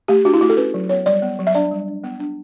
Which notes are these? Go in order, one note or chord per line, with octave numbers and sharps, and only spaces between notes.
A3 G4
D4 F#4
E4
A3 F#4
A4
C#4 B4
F#3
B3 C#5
G3 D5
B3
F#3
E5
D4 D5
G3
D4
B3
D4